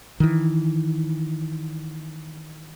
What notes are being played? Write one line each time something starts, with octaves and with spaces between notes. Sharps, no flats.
D#3 E3